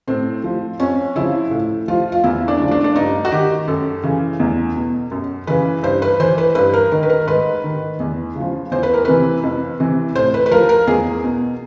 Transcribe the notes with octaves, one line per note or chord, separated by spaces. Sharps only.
A2 C4
F3
F2 C#4
C#3 F3 E4
A2
F3 F4
F4
E2 E4
D4
C#3 F3
D4
D4
G2 D#4
F#4
D#3 G4
F#2 A4
C#3 E3
E2
B2
F#2
C#3 E3 B4
G2 C5
B4
E3 C5
B4
G2 B4
A#4
D#3 A#4
B4
A#4
G#2 B4
D#3
E2
C#3 F3
E2 C5
B4
A#4
C3 E3 B4
F2
C3 E3
A2 C5
B4
B4
F3 A#4
A#4
E2 G#4
B2